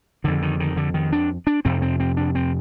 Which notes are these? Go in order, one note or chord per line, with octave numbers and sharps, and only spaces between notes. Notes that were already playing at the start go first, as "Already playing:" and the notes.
F2 D3 D#3
D#3
D#3
D3
D#3
D4
D4
F2 C3 C4
C4
C4
D4
C4